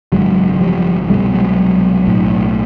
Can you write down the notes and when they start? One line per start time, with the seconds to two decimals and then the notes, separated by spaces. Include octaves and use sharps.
0.12 G#1 F#2 C#3 F#3 G#3
0.61 F3 G3
1.10 C2 B2 G3 A3
1.35 F#3 G#3
2.08 B1 A2